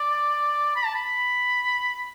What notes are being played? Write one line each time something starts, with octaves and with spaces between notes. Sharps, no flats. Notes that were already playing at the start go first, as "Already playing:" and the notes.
Already playing: D5
B5
A5
B5